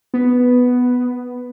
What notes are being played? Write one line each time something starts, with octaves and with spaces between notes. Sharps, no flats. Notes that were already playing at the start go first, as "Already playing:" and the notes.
B3